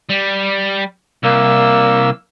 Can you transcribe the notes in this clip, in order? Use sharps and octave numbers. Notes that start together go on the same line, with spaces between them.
G3
C2 A#3 E6